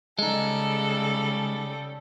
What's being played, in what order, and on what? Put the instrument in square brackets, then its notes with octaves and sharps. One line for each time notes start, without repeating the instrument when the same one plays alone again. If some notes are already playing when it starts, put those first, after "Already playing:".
[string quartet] C#3 G3 A4 [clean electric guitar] G#3 D#4